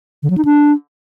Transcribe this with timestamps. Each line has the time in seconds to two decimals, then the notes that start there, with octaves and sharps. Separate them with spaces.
0.23 D3
0.30 F#3
0.38 D#4
0.45 D4